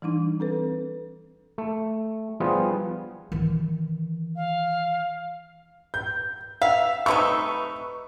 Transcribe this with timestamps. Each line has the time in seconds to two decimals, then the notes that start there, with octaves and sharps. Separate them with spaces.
0.02 E3 G3 D4 D#4
0.40 C4 A4 B4
1.58 A3
2.40 F3 G3 B3 F4 G#4
3.32 D#3 E3
4.36 F5
5.94 G6
6.62 E5 F5
7.06 C3 A3 D#4 B4 C#6 E6